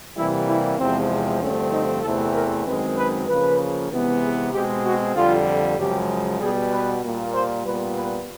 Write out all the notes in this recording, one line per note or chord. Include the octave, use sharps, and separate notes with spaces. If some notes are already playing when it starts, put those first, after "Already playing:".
C3 E3 G3 A#3 E4
E4
E2 C3 F3 G#3 C4
G2 D3 F3 A3 C4 C#4
D#4
E2 C3 E3 A3 C4 A4
A#4
F#2 D#3 G#3 C4 B4
B4
C#3 F3 A#3 B4
C3 E3 G#3 B3
G#4
B2 G#3 C4 G4
F#4
F2 D3 G3 F4
F#2 C#3 F3 G#3 G4
B2 G3 B3 G#4
B4
A#2 G3 A#3
C5
A#2 G3 B3 B4
B4